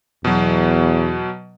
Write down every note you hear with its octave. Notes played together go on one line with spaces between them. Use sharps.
E2 B2 F#3